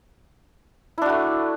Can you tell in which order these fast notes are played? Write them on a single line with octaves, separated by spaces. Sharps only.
E4 D4 F#4 A3